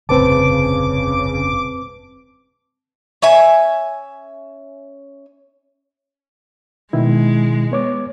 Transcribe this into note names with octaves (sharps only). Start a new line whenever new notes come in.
F1 A#1 G2 C#3 C4 B4 A5 D6
C#4 E5 G#5
B2 D#3 G#3 E4
B3 C#5 D6